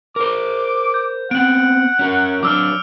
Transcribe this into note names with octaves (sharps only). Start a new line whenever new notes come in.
A#4 C5 D6
G6
B3 C4 F#5 D7 F#7
C#4 F#4 A#4
F#3 D4 D6 E6 F6